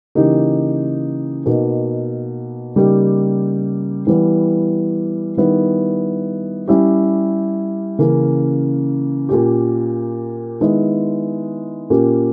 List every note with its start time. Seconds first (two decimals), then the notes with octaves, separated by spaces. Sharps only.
0.15 C#3 E3 A#3 D#4 G4
1.46 B2 A#3 D#4
2.76 C#3 G3 A#3 D#4 G4
4.07 E3 G3 B3 E4
5.37 D#3 G3 B3 E4
6.68 G3 C#4 E4 G4
7.99 C#3 E3 A#3 C#4
9.29 A#2 A#3 C#4 G4
10.60 D#3 G#3 B3 E4
11.90 A#2 A#3 C#4 G4